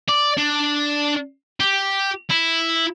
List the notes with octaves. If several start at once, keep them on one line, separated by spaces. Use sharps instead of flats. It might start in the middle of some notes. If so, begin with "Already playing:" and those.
D5
D4
G4
E4